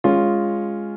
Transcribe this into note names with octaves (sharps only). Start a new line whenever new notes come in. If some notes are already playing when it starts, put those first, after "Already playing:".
G#3 C#4 F4